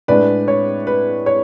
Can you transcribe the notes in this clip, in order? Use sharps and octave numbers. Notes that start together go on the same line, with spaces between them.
A2 G#3 D4 B4 D5
C#5
B4
C#5